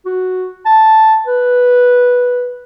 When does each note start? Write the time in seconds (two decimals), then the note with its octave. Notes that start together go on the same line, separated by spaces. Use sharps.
0.06 F#4
0.66 A5
1.27 B4